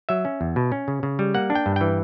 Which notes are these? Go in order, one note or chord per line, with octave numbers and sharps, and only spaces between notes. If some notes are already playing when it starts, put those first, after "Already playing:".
F#3 E5
C#4
E2
B2
C#4
C#3
C#3
G3
A#3 F#5
D4
G5
G2
E3 G5